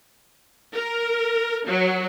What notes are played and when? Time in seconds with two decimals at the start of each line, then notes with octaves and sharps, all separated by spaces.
0.73 A#4
1.66 F#3